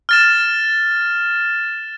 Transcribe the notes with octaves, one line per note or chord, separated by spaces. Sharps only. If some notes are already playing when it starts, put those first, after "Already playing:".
F6 A6 E7